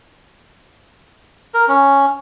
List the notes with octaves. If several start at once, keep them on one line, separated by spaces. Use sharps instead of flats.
A#4
C#4